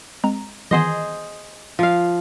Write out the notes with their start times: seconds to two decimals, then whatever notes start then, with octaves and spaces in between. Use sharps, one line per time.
0.24 G#3 C4 A#5
0.71 D#3 E3 B3 G#4 C5 D#5
1.79 F3 F5